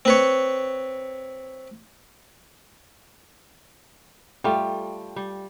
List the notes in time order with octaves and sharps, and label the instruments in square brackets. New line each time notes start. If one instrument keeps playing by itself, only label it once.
[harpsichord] C4 B4 C#5
[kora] G3 A3 F4 [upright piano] G5
[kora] G3